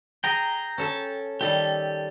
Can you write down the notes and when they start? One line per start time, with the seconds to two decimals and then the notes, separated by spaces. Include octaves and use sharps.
0.24 G#4 G5 A#5
0.78 C#4 A4 A5
1.41 D#3 G3 G4 A4